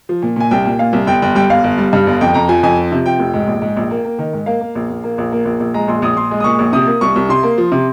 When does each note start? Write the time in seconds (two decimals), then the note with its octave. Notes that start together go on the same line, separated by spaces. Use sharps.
0.09 F3
0.22 A#2
0.36 A#2 G#5
0.51 C2 G5
0.65 A#2
0.79 A#2 F5
0.93 C2
1.07 G1 G5
1.22 G1 G5
1.35 G3 G5
1.50 G1 F5
1.64 G1
1.78 G3
1.93 G2
2.07 G1
2.21 F2 G5
2.34 F2 A#5
2.48 F3 G#5
2.63 F2 G#5
2.78 F3
2.92 C3
3.06 F3 G5
3.20 F1
3.34 G#2
3.48 A#1
3.62 G#2
3.76 A#1
3.91 A#3
4.05 A#3
4.19 D#3
4.33 G#2
4.46 A#3 F5
4.61 A#3
4.75 A#1
4.90 A#1
5.04 A#3
5.18 A#1
5.32 A#3
5.45 A#1
5.60 A#1
5.74 G#3 A#5
5.88 A#1 C6
6.02 A#1 D#6
6.16 A#1 C6
6.31 G#3
6.40 D#6
6.44 A#2 C#6
6.59 A#1
6.73 C3 D#6
6.87 A#3
7.01 C2 C#6
7.16 C2
7.29 C3 C6
7.43 A#3
7.58 F3
7.72 C3